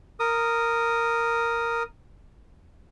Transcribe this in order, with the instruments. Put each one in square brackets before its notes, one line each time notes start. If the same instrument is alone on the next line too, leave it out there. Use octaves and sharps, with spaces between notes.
[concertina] A#4 D#6